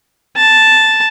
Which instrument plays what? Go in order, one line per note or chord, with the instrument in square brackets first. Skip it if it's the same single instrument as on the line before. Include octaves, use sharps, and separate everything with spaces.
[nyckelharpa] A5